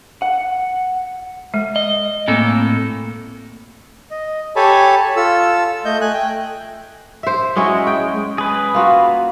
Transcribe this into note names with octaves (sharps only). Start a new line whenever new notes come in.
F#5
G#3
D#5
A2 A#3 C4 A4
D#5
G4 A4 C#5 G#5 A5 B5
F4 A4 E6
A3 D#5 G6
A3 G#5 F#6
G5
C5 E5
F#3 G#3 C#4 E4
G5
G#4 B4
A#3 F4 F#4